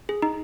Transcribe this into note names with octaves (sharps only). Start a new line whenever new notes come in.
G#4
D#4